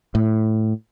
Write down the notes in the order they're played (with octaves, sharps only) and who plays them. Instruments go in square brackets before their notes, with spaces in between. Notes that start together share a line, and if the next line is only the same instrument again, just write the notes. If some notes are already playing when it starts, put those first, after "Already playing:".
[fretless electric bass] A2